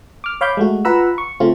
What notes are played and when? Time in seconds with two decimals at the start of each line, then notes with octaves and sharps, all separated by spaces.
0.24 D6 F6
0.41 C#5 F5 B5 D6 G6
0.57 G#3 A3 F#4
0.85 F4 B4 F#5 A#5 B5 E6
1.18 C#6
1.40 C#3 A3 C4 F4